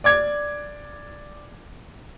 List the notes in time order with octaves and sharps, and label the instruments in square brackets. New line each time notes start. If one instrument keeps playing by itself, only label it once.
[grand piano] D5 D6 G#6